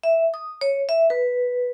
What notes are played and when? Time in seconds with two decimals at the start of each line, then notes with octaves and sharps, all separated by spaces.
0.04 E5
0.34 D#6
0.61 C#5
0.89 E5
1.10 B4